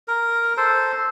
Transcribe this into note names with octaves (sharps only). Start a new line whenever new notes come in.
A#4
A4 C5